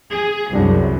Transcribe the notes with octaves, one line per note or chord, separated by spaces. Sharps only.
G#4
C2 F#2 G3 D4 G#4